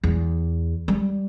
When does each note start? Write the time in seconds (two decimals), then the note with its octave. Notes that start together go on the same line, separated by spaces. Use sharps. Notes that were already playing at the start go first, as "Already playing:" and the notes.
0.04 E2
0.88 G3